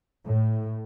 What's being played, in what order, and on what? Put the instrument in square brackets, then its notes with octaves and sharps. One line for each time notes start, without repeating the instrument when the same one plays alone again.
[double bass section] A2